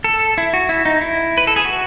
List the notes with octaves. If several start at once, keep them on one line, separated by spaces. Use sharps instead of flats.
A4
E4
F#4
E4
D#4
E4
B4
A4
G#4
F#4